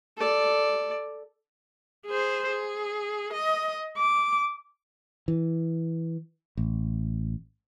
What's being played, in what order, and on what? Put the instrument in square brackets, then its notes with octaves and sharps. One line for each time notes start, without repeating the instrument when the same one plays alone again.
[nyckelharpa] A4 D5
[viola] G#4 C5
G#4
D#5
D6
[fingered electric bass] E3
A1